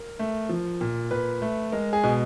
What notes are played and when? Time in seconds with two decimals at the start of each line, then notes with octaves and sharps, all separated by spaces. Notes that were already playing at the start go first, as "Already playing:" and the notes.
Already playing: A#4
0.19 A3
0.49 F3
0.81 A#2
1.11 A#2 B4
1.42 A3
1.72 G#3 A#4
1.93 G#4
2.04 B2